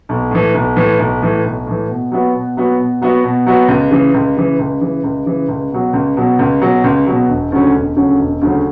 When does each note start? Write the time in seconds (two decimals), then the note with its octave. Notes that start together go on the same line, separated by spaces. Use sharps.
0.09 B1
0.31 A2 E3
0.54 B1
0.76 A2 E3
0.99 B1
1.22 A2 E3
1.44 B1
1.66 A2 E3
1.89 B2
2.12 F#3 B3 F#4
2.34 B2
2.57 F#3 B3 F#4
2.79 B2
3.02 F#3 B3 F#4
3.24 B2
3.47 F#3 B3 F#4
3.68 C#2
3.91 C#3 E3
4.14 C#2
4.37 C#3 E3
4.59 C#2
4.81 C#3 E3
5.04 C#2
5.26 C#3 E3
5.48 C#2
5.72 B2 F#3
5.93 C#2
6.17 B2 F#3
6.39 C#2
6.61 B2 F#3
6.84 C#2
7.07 B2 F#3
7.28 E1
7.52 D2 C#3 F#3 C#4
7.74 E1
7.96 D2 C#3 F#3 C#4
8.19 E1
8.41 D2 C#3 F#3 C#4